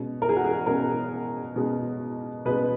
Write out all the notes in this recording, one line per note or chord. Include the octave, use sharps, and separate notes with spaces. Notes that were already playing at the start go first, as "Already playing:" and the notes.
Already playing: B2 G#3 C#4
A#4
G#4
F#4
G#4
B2 G#3 C#4 A#4
B2 G#3 C#4
B2 G#3 C#4 B4